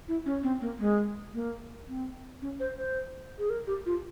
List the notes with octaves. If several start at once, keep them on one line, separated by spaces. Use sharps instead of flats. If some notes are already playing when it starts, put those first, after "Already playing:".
E4
C#4
C4
A#3
G#3
A#3
C4
C#4
C5
C5
G#4
A#4
G4
F4